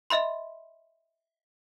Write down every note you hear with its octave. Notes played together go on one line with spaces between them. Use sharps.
D#5 E5 B5 C6